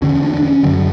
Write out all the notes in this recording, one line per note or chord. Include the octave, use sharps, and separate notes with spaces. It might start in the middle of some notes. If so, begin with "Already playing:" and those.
E2 D3 C#4
D4
D4
C#4
F#2 D3 F#3